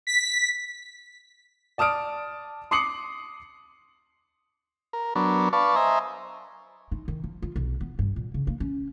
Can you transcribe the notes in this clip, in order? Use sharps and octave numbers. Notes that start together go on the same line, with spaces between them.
B6
D5 A5 D#6 F6 D7
C6 D6 D#6 C7 C#7 F#7
A#4
F#3 B3 D4 A#4
B4 D5 F5 A5 C#6
C5 D#5 E5 G#5 A#5
D#4
D#3
F3
F4
B1
B3
G2
A#2
C#3
A#3
C#4